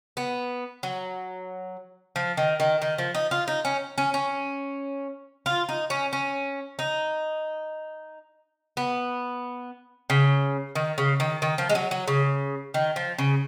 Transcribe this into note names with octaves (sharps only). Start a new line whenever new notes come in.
B3
F#3
F3
D#3
D#3
D#3
F3
D#4
F4
D#4
C#4
C#4
C#4
F4
D#4
C#4
C#4
D#4
B3
C#3
D#3
C#3
D#3
D#3
F3
G#3
F#3
F#3
C#3
D#3
F3
C#3